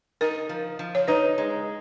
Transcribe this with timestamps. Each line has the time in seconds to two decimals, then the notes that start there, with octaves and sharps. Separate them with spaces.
0.21 D#4 A#4
0.49 F3
0.79 F3
0.95 C#5
1.08 D#4 B4
1.38 G#3